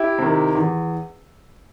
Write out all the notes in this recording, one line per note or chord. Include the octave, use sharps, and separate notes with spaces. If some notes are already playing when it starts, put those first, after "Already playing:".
Already playing: E4 G4
C3 D#3
E2